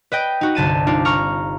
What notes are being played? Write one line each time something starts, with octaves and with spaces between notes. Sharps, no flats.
B4 D#5 G5
D#4 F#4
G1 C2 A5 D#7
D4 D#4 F4
A#5 C#6 F6